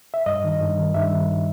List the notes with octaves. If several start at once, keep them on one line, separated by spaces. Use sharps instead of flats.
E5
G2 D#5
D#3
G2
D#3
G2 E5
D#3